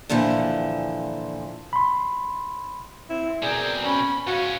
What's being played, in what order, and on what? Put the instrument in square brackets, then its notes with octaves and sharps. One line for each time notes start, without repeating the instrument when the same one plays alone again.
[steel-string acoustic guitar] A#2 D3 E3 F3
[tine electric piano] B5 C6
[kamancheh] C4 [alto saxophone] E4
[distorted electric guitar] B2 C4 [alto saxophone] G#4 [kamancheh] A#4 D5
[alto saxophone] C#4 [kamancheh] B5
[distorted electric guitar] G#2 C#4 [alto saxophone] F#4 [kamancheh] F5